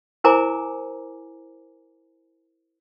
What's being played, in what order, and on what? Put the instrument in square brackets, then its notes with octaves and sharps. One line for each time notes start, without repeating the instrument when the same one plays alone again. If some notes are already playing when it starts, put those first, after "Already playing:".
[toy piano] E4 A#4 C5 G#5 A#5 D6